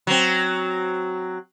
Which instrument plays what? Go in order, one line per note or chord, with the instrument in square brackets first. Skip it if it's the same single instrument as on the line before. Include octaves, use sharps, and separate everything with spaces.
[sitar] F#3 C4